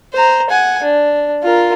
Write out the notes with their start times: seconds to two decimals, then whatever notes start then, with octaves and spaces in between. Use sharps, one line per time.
0.13 C5 A#5
0.50 F#5 G#5
0.83 D4
1.43 F4 A#4